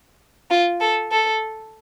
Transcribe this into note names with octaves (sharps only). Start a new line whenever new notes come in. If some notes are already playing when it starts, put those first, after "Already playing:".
F4
A4
A4